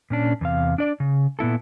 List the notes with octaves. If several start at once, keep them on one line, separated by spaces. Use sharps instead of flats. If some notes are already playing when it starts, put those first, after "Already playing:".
A#2 C#4 D4
E2 C3 F5
D4 D5
C#3
A#2 B3 E4 A4